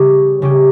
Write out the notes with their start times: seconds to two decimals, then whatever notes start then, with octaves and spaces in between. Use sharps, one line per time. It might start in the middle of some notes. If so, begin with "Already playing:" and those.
Already playing: C#3 G3 C#4 G4
0.42 C#3 G3 C#4 G4